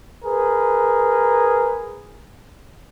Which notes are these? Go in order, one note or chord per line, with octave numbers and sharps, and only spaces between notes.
G#4 A#4 B4